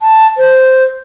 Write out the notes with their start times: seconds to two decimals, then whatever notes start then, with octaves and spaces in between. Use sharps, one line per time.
0.01 A5
0.38 C5